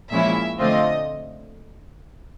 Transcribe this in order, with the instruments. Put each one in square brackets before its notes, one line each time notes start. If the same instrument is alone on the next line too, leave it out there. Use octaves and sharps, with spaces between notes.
[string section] A#2 F3 G#3 C#4 E4 E5
D3 F3 A3 C4 F4 D#5